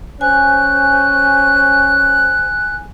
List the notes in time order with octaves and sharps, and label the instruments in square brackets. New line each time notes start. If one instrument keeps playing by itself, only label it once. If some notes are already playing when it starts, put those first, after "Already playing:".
[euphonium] C#4 [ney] C5 [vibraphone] G#5 [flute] F#6